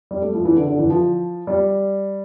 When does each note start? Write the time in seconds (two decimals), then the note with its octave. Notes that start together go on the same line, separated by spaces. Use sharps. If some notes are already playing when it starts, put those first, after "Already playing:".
0.11 G3
0.22 A3
0.34 F3
0.45 E3
0.56 D3
0.67 D3
0.79 E3
0.90 F3
1.47 G3